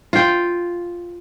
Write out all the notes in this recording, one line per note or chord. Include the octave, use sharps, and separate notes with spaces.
F4 G5